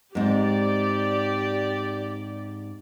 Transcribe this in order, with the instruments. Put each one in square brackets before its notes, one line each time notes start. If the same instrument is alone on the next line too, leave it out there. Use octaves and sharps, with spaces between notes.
[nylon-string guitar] G#2 C4 [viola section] G4 D5